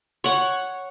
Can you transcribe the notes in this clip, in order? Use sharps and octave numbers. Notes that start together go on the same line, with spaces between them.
C#5 F#5